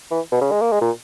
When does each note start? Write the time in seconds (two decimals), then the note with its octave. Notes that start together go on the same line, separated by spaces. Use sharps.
0.11 E3
0.32 B2
0.41 C#3
0.51 G#3
0.61 A#3
0.72 G#3
0.81 A#2